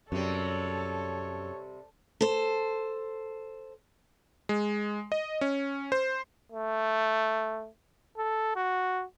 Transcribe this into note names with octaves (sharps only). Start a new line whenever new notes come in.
F#2 C3 G3 A4 C#5
A4 C5
G#3
D#5
C#4
C5
A3
A4
F#4